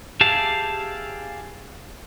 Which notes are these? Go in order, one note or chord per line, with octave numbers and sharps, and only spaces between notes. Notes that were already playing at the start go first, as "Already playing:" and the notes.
G4 G#4 E5 F5 A5